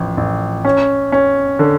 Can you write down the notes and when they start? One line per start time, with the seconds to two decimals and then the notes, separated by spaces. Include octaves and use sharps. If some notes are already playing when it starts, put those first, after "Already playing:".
Already playing: A1 F3
0.17 A1
0.65 C#4
1.12 C#4
1.59 D3